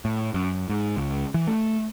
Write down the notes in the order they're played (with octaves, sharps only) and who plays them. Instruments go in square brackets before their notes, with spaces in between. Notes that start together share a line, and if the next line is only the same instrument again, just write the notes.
[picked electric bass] A2
F#2
G#2
C#2
E3
A3